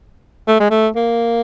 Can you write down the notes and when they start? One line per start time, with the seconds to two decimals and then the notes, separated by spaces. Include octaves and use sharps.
0.48 A3
0.60 G#3
0.70 A3
0.96 A#3